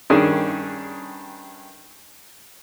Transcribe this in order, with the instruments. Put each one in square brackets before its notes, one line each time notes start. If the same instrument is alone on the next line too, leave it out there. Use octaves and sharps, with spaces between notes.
[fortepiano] G2 D#3 C#4 D4 G#4